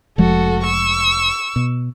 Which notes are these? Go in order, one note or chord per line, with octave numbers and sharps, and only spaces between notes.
F1 F3 G#3 F#4 A4
C#6 E6
B2